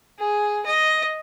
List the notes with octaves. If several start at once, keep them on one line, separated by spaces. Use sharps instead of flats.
G#4
D#5